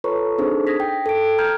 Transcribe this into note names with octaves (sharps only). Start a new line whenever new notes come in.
F4 A4 B4 C#5 A#5 C#6
C4 D4 D#4 G#4 A4 C5
D#6 G#6 A#6 B6
G5
A4 G5 D7
A#5 F6 G6 G#6